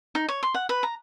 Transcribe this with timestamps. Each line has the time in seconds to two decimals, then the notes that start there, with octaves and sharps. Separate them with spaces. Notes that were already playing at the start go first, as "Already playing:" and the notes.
0.15 D#4
0.29 C#5
0.43 C6
0.55 F#5
0.69 B4
0.83 A#5